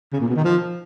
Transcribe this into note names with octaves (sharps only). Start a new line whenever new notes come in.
C#3
A#2
B2
D#3
F3